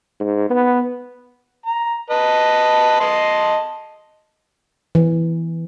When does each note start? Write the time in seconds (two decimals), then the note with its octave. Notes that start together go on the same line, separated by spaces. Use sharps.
0.20 G#2
0.50 B3
1.66 A#5
2.11 B4 D#5 A5
3.00 D#5 A5 C6
4.95 E3